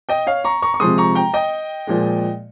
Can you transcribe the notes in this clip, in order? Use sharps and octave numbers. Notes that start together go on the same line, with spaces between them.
D#5 G5
C#5 F5
A#5 C#6
A#5 C#6
C#6
C3 F3 G#3 C6 D#6
A#5 C#6
G5 A#5
D#5 G5
A#2 F3 G#3